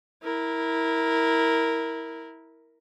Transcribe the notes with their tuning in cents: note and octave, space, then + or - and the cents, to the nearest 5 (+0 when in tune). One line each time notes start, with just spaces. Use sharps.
E4 -15 A#4 +0